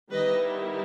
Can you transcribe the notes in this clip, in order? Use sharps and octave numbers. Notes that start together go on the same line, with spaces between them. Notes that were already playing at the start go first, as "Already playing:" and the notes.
D#3 G3 B3 E4 B4 D#5